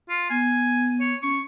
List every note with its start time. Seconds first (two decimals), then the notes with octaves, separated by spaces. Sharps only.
0.09 F4
0.30 B3 G#5
1.01 C#5
1.22 C#4 C#6